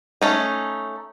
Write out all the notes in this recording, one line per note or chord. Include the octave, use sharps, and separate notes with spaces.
A3 C#4 D#4